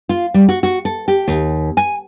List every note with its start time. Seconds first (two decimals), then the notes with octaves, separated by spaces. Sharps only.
0.09 F4
0.34 G3
0.49 F#4
0.63 F#4
0.85 A4
1.08 G4
1.28 D#2
1.77 G#5